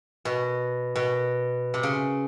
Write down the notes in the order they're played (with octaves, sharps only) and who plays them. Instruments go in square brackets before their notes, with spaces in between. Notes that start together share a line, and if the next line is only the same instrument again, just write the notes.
[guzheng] B2
B2
C3
C#3